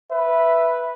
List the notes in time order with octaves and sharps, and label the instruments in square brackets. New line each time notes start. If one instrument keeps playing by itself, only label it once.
[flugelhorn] B4 [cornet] E5